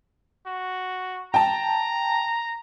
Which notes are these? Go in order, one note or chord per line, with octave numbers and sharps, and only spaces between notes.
F#4
G5 A5 A#5